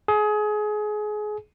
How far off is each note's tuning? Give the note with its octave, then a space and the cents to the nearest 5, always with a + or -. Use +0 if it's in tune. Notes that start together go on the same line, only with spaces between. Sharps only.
G#4 +25